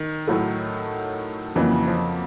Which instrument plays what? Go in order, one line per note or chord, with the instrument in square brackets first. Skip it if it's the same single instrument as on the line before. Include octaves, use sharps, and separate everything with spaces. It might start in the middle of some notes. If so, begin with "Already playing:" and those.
Already playing: [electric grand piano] D#3
[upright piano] A2 F#3 A3
[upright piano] F2 C#3 F#3 A#3 [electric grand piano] E3
[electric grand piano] F3